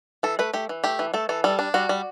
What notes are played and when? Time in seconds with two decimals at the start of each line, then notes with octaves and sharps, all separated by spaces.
0.23 E3 A4
0.39 A3 B4
0.53 A3 G4
0.69 E3
0.84 A3 G4
0.99 E3
1.14 A3 A4
1.29 E3 A4
1.44 G3 A4
1.59 D4
1.74 G3 F#4
1.89 G3